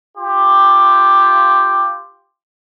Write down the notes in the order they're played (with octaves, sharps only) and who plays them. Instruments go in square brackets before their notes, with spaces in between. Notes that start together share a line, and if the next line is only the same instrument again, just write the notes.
[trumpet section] F4 G4